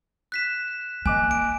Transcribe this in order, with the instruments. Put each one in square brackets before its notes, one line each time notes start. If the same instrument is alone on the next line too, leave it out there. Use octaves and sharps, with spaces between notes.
[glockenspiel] F#6 B6 E7
[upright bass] A#3 [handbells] D#5 D6 F#6 [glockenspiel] G#5
[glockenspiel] D7